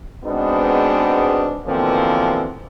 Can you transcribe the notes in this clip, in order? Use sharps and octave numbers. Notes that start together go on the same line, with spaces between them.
G#2 B2 G#3 B3 C4 D4
B2 D3 E3 F3 A#3 C4